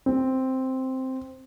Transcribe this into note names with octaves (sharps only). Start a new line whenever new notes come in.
C4